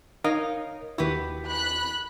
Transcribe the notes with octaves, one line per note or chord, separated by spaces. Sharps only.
D#4 A#4 C#5 D#5 F5
D#2 E4 F#4 G4 B4
B5 F#6 B6